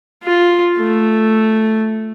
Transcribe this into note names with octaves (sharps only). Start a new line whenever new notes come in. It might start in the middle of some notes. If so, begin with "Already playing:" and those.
F4
A3